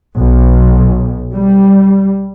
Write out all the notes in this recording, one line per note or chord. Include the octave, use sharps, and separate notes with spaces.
B1
G3